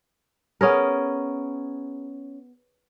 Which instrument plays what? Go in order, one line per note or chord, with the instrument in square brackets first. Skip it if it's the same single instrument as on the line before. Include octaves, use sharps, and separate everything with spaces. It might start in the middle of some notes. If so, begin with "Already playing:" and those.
[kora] B3 C#4 G#4 A#4